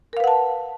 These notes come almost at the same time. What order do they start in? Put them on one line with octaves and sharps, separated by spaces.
A#4 F5 B4 F#5 A5